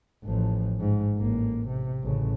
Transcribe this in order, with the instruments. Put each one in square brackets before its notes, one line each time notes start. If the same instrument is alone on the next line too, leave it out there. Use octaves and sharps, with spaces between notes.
[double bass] A1 F3
G#2
A1 A#3
C3
A1 C#3